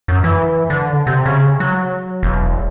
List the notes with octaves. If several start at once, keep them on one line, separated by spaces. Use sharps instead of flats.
F#2
E3
D3
C3
C#3
F#3
E1